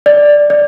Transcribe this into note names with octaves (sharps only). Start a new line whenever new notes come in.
D5
D5